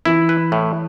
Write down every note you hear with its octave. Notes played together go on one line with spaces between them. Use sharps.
E3 E4
B4
A2